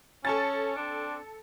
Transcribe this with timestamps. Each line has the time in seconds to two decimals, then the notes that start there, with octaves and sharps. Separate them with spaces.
0.25 C#4 A4 A5 A6
0.76 C4 D4